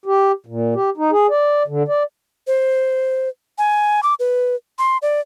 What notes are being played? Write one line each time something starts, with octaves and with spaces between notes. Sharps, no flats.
G4
A#2
G4
D#4
G#4
D5
D3
D5
C5
G#5
D6
B4
C6
D5